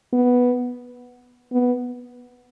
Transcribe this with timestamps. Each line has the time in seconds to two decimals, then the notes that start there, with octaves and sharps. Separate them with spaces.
0.13 B3
1.53 B3